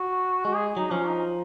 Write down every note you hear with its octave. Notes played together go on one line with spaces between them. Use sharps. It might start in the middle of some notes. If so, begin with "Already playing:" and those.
Already playing: F#4
G#3 F#4
G#4
F#3 D#4
F3 C#4
D#4